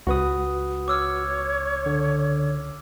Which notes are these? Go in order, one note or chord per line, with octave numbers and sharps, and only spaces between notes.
C#2 F#4 B4 D#6
C#5 D6 E6 F6
D3